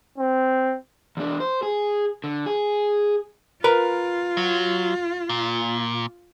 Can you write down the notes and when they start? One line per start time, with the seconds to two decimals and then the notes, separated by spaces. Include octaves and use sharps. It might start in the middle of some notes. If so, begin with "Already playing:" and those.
0.18 C4
1.17 E2 D4
1.40 C5
1.63 G#4
2.24 D3
2.46 G#4
3.64 F4 A#4 B4
4.37 F#3
5.29 A#2